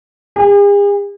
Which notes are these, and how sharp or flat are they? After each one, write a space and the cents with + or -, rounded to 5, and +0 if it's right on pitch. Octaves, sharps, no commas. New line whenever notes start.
G#4 -45